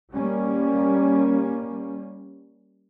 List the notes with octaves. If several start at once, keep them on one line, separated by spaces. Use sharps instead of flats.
G3 A#3 C#4